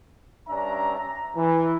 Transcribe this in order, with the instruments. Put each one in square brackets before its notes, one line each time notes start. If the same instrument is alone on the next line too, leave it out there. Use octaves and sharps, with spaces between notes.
[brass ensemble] G2 C#4 D4 E5 A#5
A#5
E3